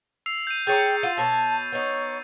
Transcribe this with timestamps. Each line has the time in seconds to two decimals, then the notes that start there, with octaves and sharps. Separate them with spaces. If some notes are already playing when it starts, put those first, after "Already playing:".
0.26 E6 C7 F7
0.47 G6 D#7
0.67 G#4 C#5 G5 A#5 G6 A6 D#7
1.03 F4 F#5 D#7
1.17 B2 C#5 A5
1.73 B3 D#4 C#5